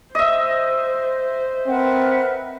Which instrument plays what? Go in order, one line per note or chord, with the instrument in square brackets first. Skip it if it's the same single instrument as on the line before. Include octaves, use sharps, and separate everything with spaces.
[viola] C5 [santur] D#5 E5
[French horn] C4 [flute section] A#4 B4 F#5